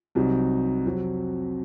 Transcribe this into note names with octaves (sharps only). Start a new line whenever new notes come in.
C2 C3 F#3 C4 D#4
F2 C3 F#3 C4